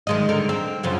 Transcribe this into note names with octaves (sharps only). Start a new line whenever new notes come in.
D#3 G#3 D#5
D3 D#3 A#4
C4
F#2 C#3 F3